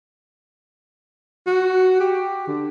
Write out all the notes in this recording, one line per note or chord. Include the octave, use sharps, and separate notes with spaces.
F#4
G4
D3